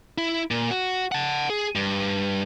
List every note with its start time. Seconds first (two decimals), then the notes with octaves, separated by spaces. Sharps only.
0.18 E4
0.51 A#2
0.71 F#4
1.12 F#5 A5
1.50 G#4
1.75 G2